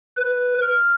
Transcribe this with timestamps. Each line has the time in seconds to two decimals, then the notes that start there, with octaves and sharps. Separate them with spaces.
0.17 B4
0.61 F6